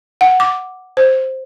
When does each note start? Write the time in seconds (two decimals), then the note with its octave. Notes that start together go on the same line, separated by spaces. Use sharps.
0.21 F#5
0.40 D6
0.97 C5